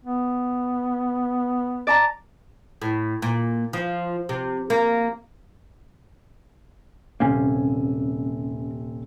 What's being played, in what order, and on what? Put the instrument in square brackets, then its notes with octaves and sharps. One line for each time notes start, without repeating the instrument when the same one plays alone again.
[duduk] B3
[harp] D5 A5 A#5
[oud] A2
A#2
F3
C3
A#3
[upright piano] D#1 C3 G#5 [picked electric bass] A#3 C4 C#4